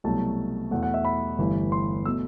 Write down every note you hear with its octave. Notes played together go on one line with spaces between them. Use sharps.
C2 B2 F#3 A3 A5
E2 B2 A3 F#5
F#5
E5
B5
G1 G2 E3 A3
C6
B2 A3 E6